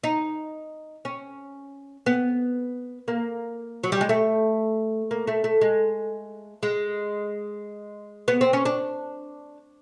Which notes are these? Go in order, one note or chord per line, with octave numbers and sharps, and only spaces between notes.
D#4
C#4
B3
A#3
F#3
G3
G#3
A3
A#3
A3
A3
G#3
G#3
B3
C4
C#4
D4